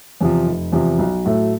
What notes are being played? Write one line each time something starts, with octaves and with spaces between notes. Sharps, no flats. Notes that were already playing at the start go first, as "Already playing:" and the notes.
E2 C3 F3
F1
E2 C3 F3
B1
A2 F#3 A3